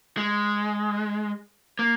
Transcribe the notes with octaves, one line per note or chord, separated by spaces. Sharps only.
G#3
A#3